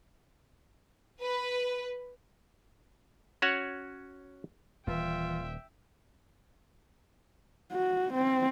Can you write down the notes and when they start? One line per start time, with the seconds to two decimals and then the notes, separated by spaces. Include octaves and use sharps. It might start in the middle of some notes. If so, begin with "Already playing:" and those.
1.21 B4
3.42 C#4 F#4 C#5 F#5
4.87 D#1 E3 F4 E5 G5
7.72 F#4
8.13 C4